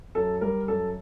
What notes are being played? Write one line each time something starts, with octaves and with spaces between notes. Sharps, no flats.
F#2 A4
G3 A#4
F#2 A4